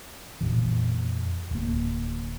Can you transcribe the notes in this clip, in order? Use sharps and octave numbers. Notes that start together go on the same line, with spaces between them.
F2 A#2 E3
D1 A#3